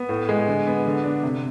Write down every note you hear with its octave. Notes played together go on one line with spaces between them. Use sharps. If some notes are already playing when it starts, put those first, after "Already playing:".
Already playing: B3
A2
G#3
D3
B3
D3
D4
C3